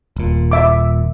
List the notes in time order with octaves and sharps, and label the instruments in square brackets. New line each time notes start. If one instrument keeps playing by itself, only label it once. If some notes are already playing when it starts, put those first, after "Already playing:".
[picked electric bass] D#1 A#2
[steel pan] E5 D6